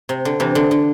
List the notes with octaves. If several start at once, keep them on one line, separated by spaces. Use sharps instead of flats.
C3
D3
C3 E3
D3
D3